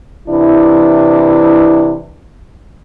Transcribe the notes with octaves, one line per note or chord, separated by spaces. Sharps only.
C3 E3 D4 E4